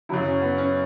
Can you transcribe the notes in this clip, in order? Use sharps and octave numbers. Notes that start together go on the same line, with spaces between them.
F#2 C#3 F#3 E4
C#4
B3
C#4